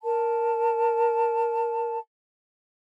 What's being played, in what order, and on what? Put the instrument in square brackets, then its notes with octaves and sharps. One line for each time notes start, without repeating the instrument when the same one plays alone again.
[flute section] A#4 A5